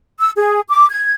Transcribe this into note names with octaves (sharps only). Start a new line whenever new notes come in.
E6
G#4
D6
G#6